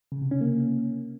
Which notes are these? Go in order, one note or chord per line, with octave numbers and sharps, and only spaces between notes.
C#3
C3
C#4
A#3